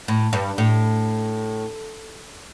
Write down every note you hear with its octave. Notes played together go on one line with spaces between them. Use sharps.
A2
G2
A2